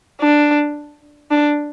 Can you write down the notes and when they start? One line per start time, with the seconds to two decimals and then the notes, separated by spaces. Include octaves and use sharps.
0.21 D4
1.31 D4